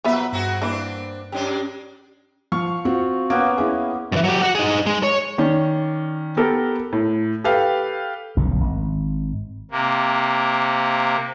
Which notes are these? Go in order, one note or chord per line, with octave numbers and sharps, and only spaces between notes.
A#2 F3 F#3 B3 B4 E5
G2 C4 F#4 G#4
E3 A#3 C4 D4
F#2 G#3 C#4 D4 G4
F3 F5 C#6
C4 F4 F#4
A#3 B3 C#4 D7
C#4 E4 G#4
F#2 E3
F#3 G4
F#4 F#5
D#4 G#4
G#3
C#5
D#3 C#4 D5
B3 G4 A4 A#4
A2
G4 A4 B4 F5 G5
F1 B1 D3 C#4
G#1
C3 A#3